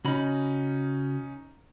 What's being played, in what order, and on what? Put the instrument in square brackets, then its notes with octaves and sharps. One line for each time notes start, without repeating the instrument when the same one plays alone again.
[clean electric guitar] C#3 F#4 B5 [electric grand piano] C#4 D#4